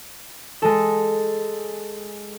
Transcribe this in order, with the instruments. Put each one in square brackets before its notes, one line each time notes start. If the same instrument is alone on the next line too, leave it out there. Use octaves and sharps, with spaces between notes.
[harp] G#3 A4